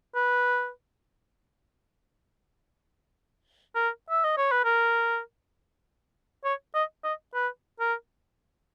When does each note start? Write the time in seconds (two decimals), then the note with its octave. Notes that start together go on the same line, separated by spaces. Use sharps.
0.15 B4
3.75 A#4
4.10 E5
4.24 D#5
4.37 C#5
4.51 B4
4.64 A#4
6.44 C#5
6.74 D#5
7.04 D#5
7.34 B4
7.80 A#4